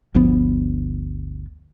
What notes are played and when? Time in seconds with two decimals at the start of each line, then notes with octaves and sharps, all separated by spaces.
0.14 G1 D2 F3 B3